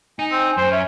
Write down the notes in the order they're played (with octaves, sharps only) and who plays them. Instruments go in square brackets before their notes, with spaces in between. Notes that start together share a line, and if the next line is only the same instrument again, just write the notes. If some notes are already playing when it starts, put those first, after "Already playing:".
[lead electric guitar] D#4 [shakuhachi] G#5
[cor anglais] C4
[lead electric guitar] F#2 [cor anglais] C5
[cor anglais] C#4 [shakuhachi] E5